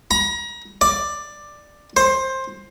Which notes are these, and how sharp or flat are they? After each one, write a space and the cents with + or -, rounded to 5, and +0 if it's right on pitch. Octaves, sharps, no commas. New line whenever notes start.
A#5 +35
D5 +10
C5 +15